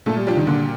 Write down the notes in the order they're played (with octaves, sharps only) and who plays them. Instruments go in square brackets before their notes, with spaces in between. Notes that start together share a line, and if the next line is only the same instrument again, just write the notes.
[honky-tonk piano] A#2 [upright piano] A3
[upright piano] G3
[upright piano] F3 [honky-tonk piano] G3 D4 G4
[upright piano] D#3
[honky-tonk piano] A#2 [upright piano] D3